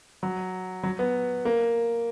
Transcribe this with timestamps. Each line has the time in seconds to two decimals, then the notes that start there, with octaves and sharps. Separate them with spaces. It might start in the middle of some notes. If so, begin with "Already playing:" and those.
0.23 F#3
0.83 F#3
0.99 B3
1.45 A#3